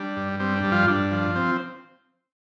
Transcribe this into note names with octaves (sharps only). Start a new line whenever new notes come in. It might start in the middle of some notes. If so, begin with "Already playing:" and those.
Already playing: G3 D4
G2
G3 C4
D4
G2
F3 F4
G2 D4
F3
C4